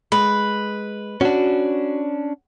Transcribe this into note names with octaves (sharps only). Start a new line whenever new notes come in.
G#3 B4
C#4 D4 F#4